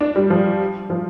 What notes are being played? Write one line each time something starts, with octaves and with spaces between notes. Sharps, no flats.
D4
G3
F3
F3